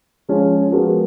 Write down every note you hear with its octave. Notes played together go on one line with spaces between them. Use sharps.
F3 G#3 C#4
F3 G#3 B3 F#4 A#4